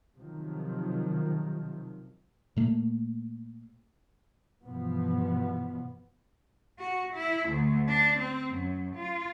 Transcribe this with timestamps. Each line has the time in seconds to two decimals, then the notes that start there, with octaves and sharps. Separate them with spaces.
0.17 C3 D#3 F3 F#3
2.57 A#2 A3 A#3
4.65 G2 B2 E3 F3 B3
6.79 F#4
7.14 E4
7.49 D2
7.88 D4
8.18 C4
8.54 F#2
8.96 F4